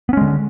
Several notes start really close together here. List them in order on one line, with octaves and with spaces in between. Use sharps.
B3 C#4 G#3 D3